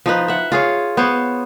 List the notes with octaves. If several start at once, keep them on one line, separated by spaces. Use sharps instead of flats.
F3 D#4 B4
E5 F#5
F4 G#4 C#5
B3 C5 C#5